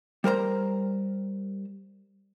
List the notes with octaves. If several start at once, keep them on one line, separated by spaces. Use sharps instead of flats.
G3 A#4 C5 A#5